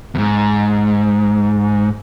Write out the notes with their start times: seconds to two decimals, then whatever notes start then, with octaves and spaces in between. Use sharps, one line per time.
0.15 E2 G#2